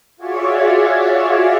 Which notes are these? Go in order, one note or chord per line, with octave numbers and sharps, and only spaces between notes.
F4 F#4 G#4 C#5 D5 E5